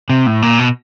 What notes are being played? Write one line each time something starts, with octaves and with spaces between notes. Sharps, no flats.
C3
A2
A#2
B2